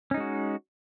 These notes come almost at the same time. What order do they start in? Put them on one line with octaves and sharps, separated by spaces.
C#4 D#4 G#3 F#4